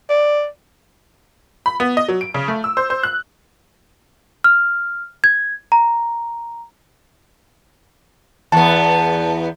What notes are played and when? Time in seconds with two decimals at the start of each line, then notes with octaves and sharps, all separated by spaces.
0.10 D5
1.66 B5
1.80 B3
1.97 D#5
2.08 F#3
2.21 D7
2.34 C#3
2.48 A3
2.64 E6
2.77 C5
2.90 C5
3.03 F#6
4.44 F6
5.24 G#6
5.72 A#5
8.52 E2 B3 A5